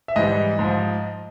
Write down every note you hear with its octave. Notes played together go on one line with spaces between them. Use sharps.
E5
G#2 E3 G3 D#5
G#2 F3